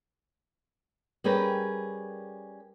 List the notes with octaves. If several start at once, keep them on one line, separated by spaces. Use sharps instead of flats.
G3 C#4 G#4 A#4 B4 G5